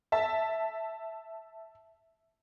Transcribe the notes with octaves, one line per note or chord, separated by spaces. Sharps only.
E5 A5